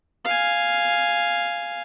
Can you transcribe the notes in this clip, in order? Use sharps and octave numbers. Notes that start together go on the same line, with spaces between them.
F5 G#5